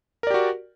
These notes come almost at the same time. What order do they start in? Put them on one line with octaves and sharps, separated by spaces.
A#4 D5 G4 F#4